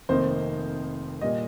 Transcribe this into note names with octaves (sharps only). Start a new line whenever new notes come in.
F1 F2 D#3 A#3 D#4 C5
A#2 G3 D#5